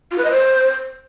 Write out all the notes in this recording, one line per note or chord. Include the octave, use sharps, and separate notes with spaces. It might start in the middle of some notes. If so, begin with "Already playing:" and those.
F4
B4
D#5
C5